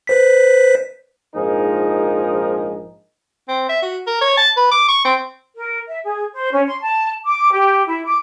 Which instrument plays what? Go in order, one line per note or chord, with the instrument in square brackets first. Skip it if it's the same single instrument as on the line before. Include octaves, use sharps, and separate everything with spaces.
[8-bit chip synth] B4 C5 B6
[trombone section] A#1 G#2 F3 D#4 G#4 A#4
[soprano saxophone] C4
E5
F#4
A#4
C#5
A5
B4
D6
C#6
C4
[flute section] A#4
E5
G#4
C5
C#4
C6
A5
D6
G4
E4
D6